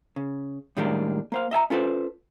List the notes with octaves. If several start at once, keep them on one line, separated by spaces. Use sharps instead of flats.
C#3
A2 D#3 G3 G#3 A#3 D4
A#3 C5 F5
D#5 E5 G#5 A#5
C#4 F4 A4 B4 C5